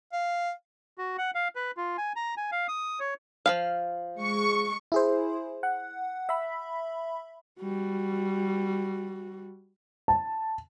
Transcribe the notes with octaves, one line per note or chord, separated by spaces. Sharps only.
F5
F#4
F#5
F5
B4
F4
G#5
A#5
G#5
F5
D#6
C#5
F3 E4 F5
G#3 C#6
E4 G#4 C5
F#5
E5 B5
G3 F#4
A5